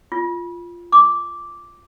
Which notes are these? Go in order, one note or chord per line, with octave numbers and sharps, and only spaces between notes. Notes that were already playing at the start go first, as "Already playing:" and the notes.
F4
D6